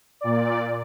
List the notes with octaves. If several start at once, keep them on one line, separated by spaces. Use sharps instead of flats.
A#2 D5